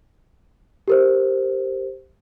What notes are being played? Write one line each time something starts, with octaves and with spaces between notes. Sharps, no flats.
G4 A#4 C5